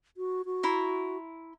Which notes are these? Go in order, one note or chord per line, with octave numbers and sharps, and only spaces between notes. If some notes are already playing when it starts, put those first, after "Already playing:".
F#4
F#4
E4 A#5 C6